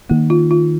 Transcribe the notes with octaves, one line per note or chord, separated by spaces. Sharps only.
D#3 A#3
F4
F4